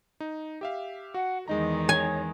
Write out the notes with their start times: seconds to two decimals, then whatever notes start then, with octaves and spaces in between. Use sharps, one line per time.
0.20 D#4
0.61 G4 E5 F5
1.14 F#4 F#5
1.48 E2 D#3 G#3 D#4 D#5 A#5
1.89 C#5 G#5